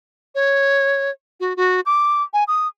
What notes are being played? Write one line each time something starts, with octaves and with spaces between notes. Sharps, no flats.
C#5
F#4
F#4
D6
G#5
D#6